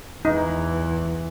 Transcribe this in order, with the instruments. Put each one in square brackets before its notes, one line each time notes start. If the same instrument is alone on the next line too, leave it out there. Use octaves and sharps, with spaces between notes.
[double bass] E2 E3 [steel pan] D#4